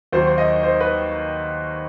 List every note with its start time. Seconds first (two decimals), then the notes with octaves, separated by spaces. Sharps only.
0.12 D#2 D#3 F#3 C5
0.27 C5
0.38 D#5
0.63 C5
0.81 B4